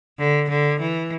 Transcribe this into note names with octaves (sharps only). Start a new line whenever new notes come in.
D3
D3
E3